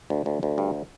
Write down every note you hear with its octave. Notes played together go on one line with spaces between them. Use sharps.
D2
D2
D2
G2